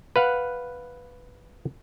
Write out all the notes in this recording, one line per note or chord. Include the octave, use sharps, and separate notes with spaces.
B4 F5 F#5